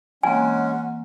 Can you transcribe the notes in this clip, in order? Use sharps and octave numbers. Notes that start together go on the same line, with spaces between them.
E3 G#3 A#3 C4 C#4 F#5 G#5